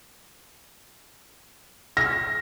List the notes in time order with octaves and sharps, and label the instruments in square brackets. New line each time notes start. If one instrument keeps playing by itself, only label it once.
[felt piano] A#6